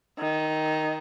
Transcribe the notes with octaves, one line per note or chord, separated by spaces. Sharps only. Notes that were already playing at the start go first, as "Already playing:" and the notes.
D#3